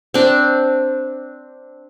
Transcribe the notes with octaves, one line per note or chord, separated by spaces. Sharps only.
C4 D4